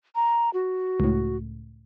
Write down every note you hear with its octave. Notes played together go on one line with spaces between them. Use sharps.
A#5
F#4
C#2 A2